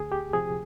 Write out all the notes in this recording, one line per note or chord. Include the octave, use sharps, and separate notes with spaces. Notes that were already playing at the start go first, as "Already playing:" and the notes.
Already playing: D2 G#4
G4
C3 F3 G#4